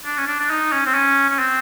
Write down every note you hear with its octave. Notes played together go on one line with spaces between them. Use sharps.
D4
C#4
D4
D4
D#4
C#4
C4
C#4
C#4
C4